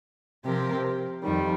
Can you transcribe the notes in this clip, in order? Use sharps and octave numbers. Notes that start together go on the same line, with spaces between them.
C3 F3 C4 G4 A#4
F2 D#3 G3